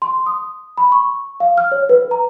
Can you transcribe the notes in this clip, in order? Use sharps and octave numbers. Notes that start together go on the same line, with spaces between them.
C6
D#6
B5
C#6
F5
F6
C#5
B4
A#5